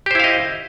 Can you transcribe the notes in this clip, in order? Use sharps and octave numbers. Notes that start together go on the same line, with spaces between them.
E4 G4 C5 D#5 F5